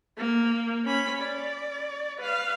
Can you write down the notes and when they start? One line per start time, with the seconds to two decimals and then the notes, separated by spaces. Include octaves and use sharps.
0.18 A#3
0.85 C#4 B5
1.22 D5
2.18 B4 F5